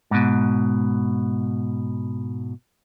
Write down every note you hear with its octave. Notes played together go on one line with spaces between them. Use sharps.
G#2 B2